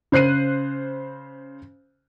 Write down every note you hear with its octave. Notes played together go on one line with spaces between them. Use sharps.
C#3 C5 F#6 C7 D#7